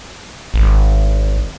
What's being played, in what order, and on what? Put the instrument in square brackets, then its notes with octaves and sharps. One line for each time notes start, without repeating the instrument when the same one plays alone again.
[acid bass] G#1